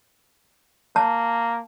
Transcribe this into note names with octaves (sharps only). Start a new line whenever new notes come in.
A#3 A5